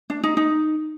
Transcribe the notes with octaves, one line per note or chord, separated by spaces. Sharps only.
D4
D#4
D#4